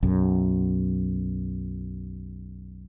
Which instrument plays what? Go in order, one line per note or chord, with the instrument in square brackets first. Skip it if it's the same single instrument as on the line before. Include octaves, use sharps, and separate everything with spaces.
[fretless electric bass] B1 F#2